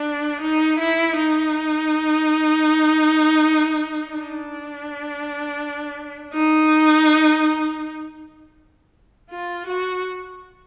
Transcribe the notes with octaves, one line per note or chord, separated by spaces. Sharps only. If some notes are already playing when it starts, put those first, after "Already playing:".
Already playing: D4
D#4
E4
D#4
D4
D#4
F4
F#4